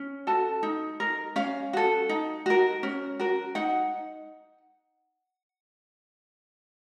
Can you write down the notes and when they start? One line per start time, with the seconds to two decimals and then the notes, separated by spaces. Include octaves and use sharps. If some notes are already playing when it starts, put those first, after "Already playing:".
Already playing: C#4
0.27 F#4 A4 A5
0.63 D#4
1.00 A#4
1.36 C#4 F5
1.73 F#4 A4
2.09 D#4
2.46 F#4 A#4
2.83 C#4
3.20 F#4 A#4
3.55 D#4 F#5